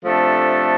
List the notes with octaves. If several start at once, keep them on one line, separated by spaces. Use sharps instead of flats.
C3 F3 A3 D4 A4